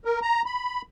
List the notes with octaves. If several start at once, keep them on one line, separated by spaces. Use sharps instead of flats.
A#4
A#5
B5